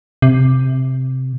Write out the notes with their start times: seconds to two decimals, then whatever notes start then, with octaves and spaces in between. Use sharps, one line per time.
0.22 C3